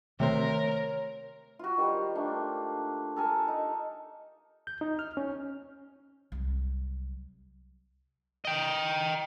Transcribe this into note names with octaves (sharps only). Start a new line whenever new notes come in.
C3 D#3 A3 A#4 C5 C#5
F4 F#4
D#3 G3 C5
A3 A#3 D4
A4 A#4 G#5 A5
D#4
G6
D#4
F6
C#4
C2 F#3
D#5 G5